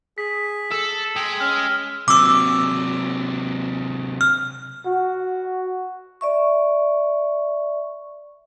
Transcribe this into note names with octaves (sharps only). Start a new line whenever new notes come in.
G#4 B6
A4 E6
G#3 G5
C#4 F6
C3 F#3 D6 E6
F6
F#4
D5 E5 C#6